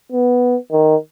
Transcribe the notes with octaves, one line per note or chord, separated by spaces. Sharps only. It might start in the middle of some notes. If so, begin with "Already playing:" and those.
B3
D#3